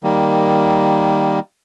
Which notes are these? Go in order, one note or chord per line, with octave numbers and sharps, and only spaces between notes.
D#3 G3 A#3